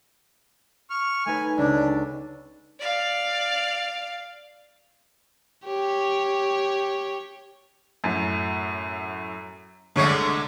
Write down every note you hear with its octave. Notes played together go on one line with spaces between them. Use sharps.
C#6 F6
A3 D#4 B4 G#5
C#2 D4
D5 F5
G4 C#5
F#2 A2
C2 D3 G#3 A3 C#5 C#6